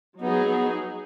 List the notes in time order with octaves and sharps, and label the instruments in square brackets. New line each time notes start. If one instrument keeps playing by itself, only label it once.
[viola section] F#3 D#4 G#4 [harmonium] B3
[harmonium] B3